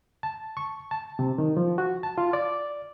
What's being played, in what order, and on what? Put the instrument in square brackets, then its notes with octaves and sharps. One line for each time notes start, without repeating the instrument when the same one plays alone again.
[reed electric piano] A5
C#6
A5
C3
D#3
F3
F#4
A5
F4
D5